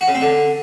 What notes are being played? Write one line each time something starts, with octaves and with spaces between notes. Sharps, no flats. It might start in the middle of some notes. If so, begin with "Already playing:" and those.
F#4
C#3
C4
D3